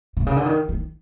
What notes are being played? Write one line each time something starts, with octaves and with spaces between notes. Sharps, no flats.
C3
C#3
D3
D#3
D#3